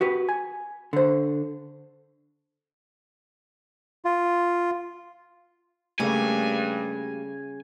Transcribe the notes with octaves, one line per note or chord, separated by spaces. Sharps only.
F#4 G4 B4
G#5
D3 C5
F4
G2 C#3 G3 A3 A#3 G#5